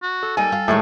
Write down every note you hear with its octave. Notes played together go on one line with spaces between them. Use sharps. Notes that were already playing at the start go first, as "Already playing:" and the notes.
F#4
A4
G3 A#3 D#4 A4 G#5
F4
A2 D#3 G3 G#3